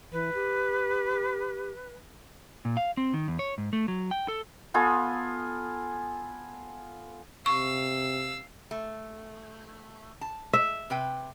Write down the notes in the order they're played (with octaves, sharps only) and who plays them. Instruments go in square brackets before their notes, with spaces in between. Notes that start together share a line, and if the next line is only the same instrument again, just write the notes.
[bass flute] E3 [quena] B4
[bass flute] G4
[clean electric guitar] A#2
F5
C4
D#3
E2
C#5
G#2
A3
F#3
G5
A4
[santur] B3 F4 A4 G#5
[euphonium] C3 [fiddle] F5 E6 [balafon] C#6
[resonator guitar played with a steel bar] A3
A5
[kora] E5
[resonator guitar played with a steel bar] C3 B4 G5